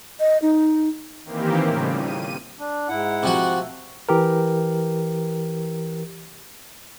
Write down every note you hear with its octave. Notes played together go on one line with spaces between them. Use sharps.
D#5
D#4
D#3 E3 A#3 C4 G4
A2 C#3 F3 G3
D#7
D4
G#2 E4 F#5
C3 F3 F#4
A3
E3 G4 A#4